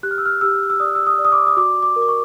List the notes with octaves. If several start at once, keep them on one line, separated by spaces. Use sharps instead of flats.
G4 F#6
F6
E6
F6
G4 E6
E6
D5 D#6
E6
D#6
D5
D#6
D6
D#6
F#4 D6
D6
A#4
D6
C#6